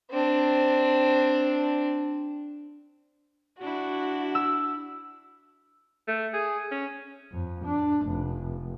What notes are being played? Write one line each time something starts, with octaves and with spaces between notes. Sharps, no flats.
C4 D4
D4 E4 F#4
E6
A3
G#4
C#4
F2
D4
F1